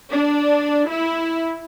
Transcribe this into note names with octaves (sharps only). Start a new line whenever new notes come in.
D4
E4